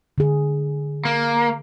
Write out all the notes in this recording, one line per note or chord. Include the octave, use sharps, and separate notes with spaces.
D3 G#4
A#3